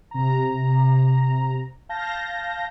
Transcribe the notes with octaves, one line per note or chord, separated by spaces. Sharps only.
C3 A#5
F5 A5 G6 A#6